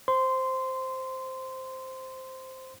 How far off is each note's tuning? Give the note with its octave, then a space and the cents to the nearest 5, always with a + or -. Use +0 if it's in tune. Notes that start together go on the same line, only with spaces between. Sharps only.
C5 +0 C6 -15